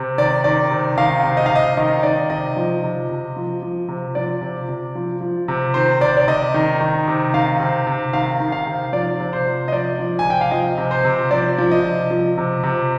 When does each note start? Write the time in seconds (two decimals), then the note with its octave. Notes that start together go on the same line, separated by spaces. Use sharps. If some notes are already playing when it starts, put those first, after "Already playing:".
Already playing: C3
0.18 D#3 D5
0.44 D#3 D5
0.71 C3
0.98 D#3 F5
1.24 C3
1.37 D#5
1.46 F5
1.50 C3
1.55 D#5
1.77 D#3 D#5
2.03 D#3 D5
2.30 C3 D#5
2.57 F3
2.84 C3
3.09 C3
3.36 F3
3.62 F3
3.88 C3
4.15 F3 D5
4.42 C3
4.69 C3
4.95 F3
5.21 F3
5.48 C3
5.74 D#3 C5
6.00 C3 D5
6.17 D5
6.28 C3 D#5
6.54 D#3
6.81 D#3
7.08 C3
7.34 D#3 F5
7.60 C3
7.87 C3
8.13 D#3 F5
8.40 D#3
8.52 F5
8.67 C3
8.93 F3 D5
9.20 C3
9.33 C5
9.46 C3
9.68 D#5
9.72 F3 D5
9.99 F3
10.19 G#5
10.25 C3
10.30 G5
10.41 F5
10.51 F3 D#5
10.78 C3
10.91 C5
11.05 C3
11.31 F3 D5
11.58 F3
11.71 D#5
11.84 C3
12.11 F3
12.38 C3
12.63 C3